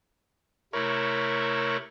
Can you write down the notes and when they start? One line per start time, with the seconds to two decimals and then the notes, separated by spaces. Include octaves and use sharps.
0.73 C3 A3 E4 A#4 C#5